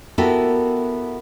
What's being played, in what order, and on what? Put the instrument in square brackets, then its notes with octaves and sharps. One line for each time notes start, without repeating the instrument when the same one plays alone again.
[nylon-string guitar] B3 E4 F#4 G4 A4 A#4